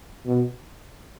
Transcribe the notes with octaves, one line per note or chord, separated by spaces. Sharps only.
B2